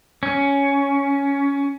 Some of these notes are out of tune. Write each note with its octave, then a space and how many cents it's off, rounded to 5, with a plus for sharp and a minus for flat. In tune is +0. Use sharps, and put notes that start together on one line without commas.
C#4 +10